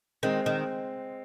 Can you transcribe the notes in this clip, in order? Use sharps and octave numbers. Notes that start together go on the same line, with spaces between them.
D#3 G#3 C4
D#3